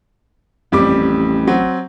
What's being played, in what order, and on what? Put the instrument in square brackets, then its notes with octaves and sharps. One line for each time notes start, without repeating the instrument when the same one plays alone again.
[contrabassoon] A1 [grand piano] F2 G3 D6
[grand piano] F#3 C4